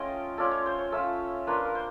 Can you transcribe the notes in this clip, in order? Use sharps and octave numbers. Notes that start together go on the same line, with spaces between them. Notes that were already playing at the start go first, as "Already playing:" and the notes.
Already playing: A3 C#4 F4 D#5 G5
A3 C#4 F4 D5
C#5
C5
C#5
A3 C#4 F4 E5
A#3 D4 F4 B4
A#4
C5